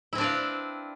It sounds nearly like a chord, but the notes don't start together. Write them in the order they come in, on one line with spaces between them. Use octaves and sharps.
E4 C4 D4 B4 F5